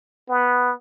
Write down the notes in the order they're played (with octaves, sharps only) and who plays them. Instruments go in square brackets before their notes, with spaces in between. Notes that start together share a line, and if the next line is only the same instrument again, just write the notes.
[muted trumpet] B3